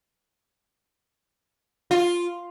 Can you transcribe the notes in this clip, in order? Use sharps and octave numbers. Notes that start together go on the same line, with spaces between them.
F4